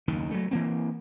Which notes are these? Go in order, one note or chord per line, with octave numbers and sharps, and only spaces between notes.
F#1 D#2 D#3
F#3 A3
E3 A#3 C4